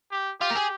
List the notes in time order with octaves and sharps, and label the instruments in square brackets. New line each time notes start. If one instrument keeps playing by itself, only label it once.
[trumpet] G4
[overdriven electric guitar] F4 [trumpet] G4
[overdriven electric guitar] A#4
G#4